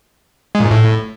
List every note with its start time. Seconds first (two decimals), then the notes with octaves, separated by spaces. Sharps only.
0.55 G#3
0.60 A#2
0.65 G#2
0.71 A2